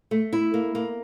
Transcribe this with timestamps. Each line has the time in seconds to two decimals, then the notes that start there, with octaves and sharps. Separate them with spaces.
0.11 A3
0.33 E4
0.54 A#3
0.75 A#3